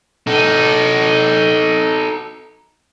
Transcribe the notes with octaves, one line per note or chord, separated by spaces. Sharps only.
D#4 A4